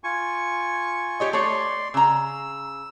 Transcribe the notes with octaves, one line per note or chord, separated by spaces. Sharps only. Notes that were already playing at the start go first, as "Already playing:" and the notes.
F4 G#5 C#6
G4 C#5 D#5
A3 C#5 D5 C6
C#3 A#5 E6